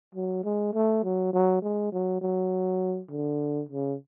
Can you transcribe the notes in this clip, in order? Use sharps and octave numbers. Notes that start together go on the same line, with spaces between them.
F#3
G#3
A3
F#3
F#3
G#3
F#3
F#3
D3
C#3